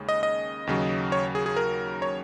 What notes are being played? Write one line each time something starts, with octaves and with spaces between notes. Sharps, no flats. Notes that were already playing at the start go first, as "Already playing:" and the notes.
Already playing: D#2 C#3 G#3
D#5
D#5
D#2 C#3 F#3
C#5
G#4
G#4
A#4
C#5